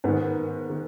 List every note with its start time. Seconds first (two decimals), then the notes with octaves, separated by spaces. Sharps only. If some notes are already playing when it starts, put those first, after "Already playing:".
0.04 G#2 D#3 B3
0.70 D#3